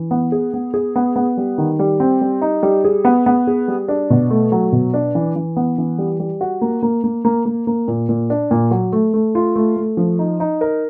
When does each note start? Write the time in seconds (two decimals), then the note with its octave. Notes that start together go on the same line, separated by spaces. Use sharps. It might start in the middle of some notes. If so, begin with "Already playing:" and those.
Already playing: E3
0.11 B3
0.32 G#4
0.54 B3
0.74 G#4
0.96 B3
1.16 B3
1.37 G3
1.58 D#3
1.79 G3
2.00 C4
2.21 G3
2.41 D#4
2.63 G3
2.84 G#4
3.05 B3
3.26 B3
3.47 G#4
3.68 G3
3.88 D4
4.10 B2
4.31 A3
4.52 F#3
4.72 B2
4.94 D4
5.15 E3
5.36 E3
5.57 B3
5.78 E3
5.98 G3
6.20 G3
6.41 F#4
6.61 A#3
6.83 A#3
7.04 A#3
7.25 A#3
7.46 A#3
7.67 A#3
7.88 A#2
8.09 A#2
8.30 D4
8.51 A#2
8.71 F#3
8.93 A3
9.14 A3
9.35 F4
9.56 A3
9.76 A3
9.97 F3
10.19 D#4
10.40 D#4
10.61 A#4